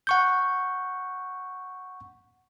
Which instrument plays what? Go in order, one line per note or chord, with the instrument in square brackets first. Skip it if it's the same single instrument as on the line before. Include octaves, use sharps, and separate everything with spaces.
[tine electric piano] F#5 C#6 G6